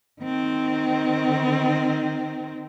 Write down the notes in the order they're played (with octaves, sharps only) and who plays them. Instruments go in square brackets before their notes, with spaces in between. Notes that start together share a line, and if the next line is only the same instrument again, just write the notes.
[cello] D#3 C4